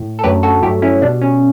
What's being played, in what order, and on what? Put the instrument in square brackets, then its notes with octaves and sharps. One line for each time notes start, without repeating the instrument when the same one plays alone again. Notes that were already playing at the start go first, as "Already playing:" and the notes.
Already playing: [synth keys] A2
A4
F#2 D3 F#3 A3 G4 B4
F#4 A4
G2 F#3 A3 E4 G4
C#4 E4
B2 G3 D4
C#4